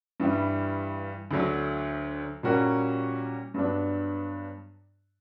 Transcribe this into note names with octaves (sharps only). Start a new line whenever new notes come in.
G2 E3 G3
D2 D3 F#3
A#2 G3 C#4 F#4 A#4
G2 F#3 B3 D4